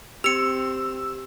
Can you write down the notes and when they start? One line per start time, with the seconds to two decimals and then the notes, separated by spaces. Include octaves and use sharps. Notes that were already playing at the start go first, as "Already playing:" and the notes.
0.24 C4 G4 E6 C#7 F7